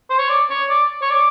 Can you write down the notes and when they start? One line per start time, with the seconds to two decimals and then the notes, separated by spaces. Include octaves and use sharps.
0.10 C5
0.19 C#5
0.29 D5
0.50 C#5
0.69 D5
1.02 C#5
1.10 D5